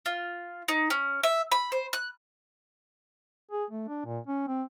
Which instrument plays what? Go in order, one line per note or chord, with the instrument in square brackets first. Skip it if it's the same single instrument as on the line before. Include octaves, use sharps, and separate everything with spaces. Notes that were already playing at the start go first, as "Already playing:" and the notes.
[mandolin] F4
D#4
C#4
E5
B5
C5
F#6
[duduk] G#4
A3
D4
A#2
C#4
C4